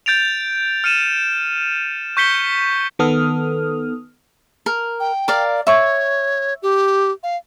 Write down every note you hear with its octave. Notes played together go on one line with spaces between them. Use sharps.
G6 A6 D7 F7
F6 C#7 D#7 E7
C#6 G6 B6 C#7 G7
D#3 B3 A4 D#6 F6
A#4
G5
A#4 D5 F5
C#5 E5 C#6
G4
F5